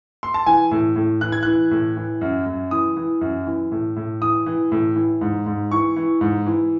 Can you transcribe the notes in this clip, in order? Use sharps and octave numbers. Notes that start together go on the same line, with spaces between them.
C6
A5
E3 G#5
A2
A2
E3 F#6
G#6
E3 F#6
A2
E3
F#2
F#2
E3 D#6
E3
F#2
E3
A2
A2
E3 D#6
E3
A2
E3
G#2
G#2
E3 C#6
E3
G#2
E3